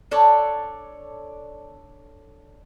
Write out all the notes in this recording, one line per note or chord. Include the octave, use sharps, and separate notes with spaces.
D4 A4 C#5 D5